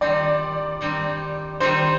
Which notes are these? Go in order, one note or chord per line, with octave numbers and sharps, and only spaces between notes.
D#3 G3 C4 D#4 D5
D#3 G3 C4 D#4
D#3 G3 C4 D#4 C5